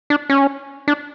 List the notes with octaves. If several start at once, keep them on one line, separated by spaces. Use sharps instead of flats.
D4
C#4
D4